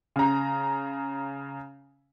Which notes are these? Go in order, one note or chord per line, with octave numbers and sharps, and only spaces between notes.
C#3 A#5